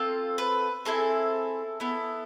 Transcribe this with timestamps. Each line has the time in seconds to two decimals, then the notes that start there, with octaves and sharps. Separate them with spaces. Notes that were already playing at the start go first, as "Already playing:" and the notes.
Already playing: C4 F4 A4
0.38 B4
0.85 C4 E4 G#4 A4
1.80 B3 E4 A4